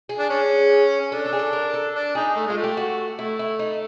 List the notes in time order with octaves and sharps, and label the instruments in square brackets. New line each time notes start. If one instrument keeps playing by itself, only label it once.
[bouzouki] G#4
[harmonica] D4
C#4
C#4
[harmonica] D4 [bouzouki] A4
[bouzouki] A4
G#4
A4
A#4
A4
[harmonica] D4
[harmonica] D#4 [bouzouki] G#4
[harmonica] A3
[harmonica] G#3 [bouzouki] F4
[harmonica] A3
[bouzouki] G4
F#4
[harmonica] A3 [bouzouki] E4
[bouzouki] E4
D#4